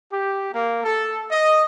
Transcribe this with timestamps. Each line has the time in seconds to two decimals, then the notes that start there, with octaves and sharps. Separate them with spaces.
0.11 G4
0.53 A#3
0.84 A4
1.30 D#5